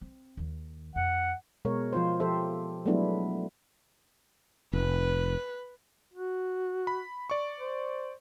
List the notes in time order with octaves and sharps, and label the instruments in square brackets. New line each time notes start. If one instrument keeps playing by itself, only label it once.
[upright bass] C4
D#2 D#3
[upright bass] F2 [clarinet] F#5
[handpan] B2 G#3 A#4 C#5
F3 F4 C5
F3 G4 A4 C5 E5
F#3 G#3 A3 B3 D4 E4
[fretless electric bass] F1 [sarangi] B4
[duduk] F#4
[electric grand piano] B5
D5 C#6
[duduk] C5